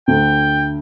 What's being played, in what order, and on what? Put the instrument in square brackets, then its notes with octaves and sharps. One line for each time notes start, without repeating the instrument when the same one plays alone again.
[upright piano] D2 [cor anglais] G5